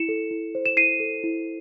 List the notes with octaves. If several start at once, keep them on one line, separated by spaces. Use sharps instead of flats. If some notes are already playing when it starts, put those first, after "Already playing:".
Already playing: E4 C#7 E7
A4
E4
C5
E7
E4 C7 D#7
A4
E4